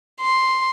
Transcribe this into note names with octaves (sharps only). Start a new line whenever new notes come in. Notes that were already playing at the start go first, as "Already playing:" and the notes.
C6